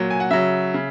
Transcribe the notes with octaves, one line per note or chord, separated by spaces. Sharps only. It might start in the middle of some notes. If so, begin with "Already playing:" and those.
Already playing: A#2 F#3
G#5
F#5
C#3 F#3 E5
C#3